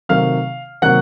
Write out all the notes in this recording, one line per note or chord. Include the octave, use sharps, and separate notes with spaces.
C3 D#3 F#3 A3 F5 F6
C3 D#3 F#3 A#3 F#5 F#6